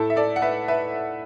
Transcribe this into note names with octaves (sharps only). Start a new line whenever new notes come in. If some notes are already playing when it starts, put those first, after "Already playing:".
Already playing: A2 A3 E4 A4
E5
A4 D5
F#5
B4 E5
B4 E5